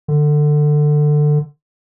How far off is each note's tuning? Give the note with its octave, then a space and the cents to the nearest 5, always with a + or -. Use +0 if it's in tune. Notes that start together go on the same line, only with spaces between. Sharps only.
D3 +20